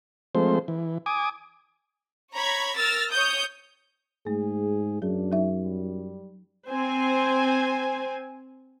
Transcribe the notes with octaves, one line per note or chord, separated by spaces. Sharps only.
F3 G#3 A3 C4 C5
E3
G#5 D6 D#6
C#5 A#5 B5 G#6
A#4 E6 F6 A6 A#6
C#5 D#6 G6
G#2 A3 G#4
F#2 F#3 D4 G#4
F#3 D#4 E5
G3
C4 C5 G#5